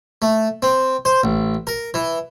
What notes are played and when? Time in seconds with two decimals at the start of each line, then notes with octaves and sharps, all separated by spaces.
0.22 A3
0.62 C4
1.05 C5
1.24 A1
1.67 A#4
1.94 E3